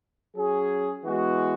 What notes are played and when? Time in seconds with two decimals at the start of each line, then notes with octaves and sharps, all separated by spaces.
0.36 F#3 C#4 G#4
1.05 E3 G#3 B3 F#4